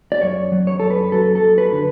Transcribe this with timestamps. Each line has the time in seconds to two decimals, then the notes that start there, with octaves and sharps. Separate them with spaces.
0.12 D5
0.21 F#2 C#5
0.52 F#3
0.67 C#5
0.80 F#2 A4
0.90 B4
1.12 F#3 A4
1.35 A4
1.43 F#2
1.58 B4
1.72 D3